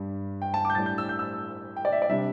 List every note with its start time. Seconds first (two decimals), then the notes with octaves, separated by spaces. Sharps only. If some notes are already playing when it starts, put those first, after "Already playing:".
Already playing: G2 G3
0.42 G5
0.54 A5
0.65 D6
0.70 G6
0.75 A2 G3 D4 A6
0.86 G6
0.98 E6
1.09 G6
1.19 E6
1.77 G5
1.85 D5
1.92 E5
2.02 D5
2.09 C3 G3 D4 E5